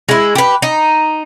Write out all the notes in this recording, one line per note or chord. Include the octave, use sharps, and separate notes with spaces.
G#3 E4
G4 B4
D#4